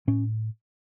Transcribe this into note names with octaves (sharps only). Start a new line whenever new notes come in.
A2 C#4